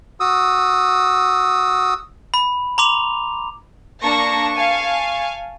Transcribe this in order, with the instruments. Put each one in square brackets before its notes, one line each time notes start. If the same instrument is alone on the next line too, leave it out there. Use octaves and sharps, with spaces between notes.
[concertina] F#4 D#6 E6
[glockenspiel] B5
A#5 C6 D6 F7
[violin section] A#3 D4 A5 C#6 A#6
F5 G#5 A5 C#6